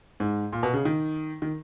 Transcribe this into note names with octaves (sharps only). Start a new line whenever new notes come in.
G#2
A#2
B2
C#3
D#3
D#3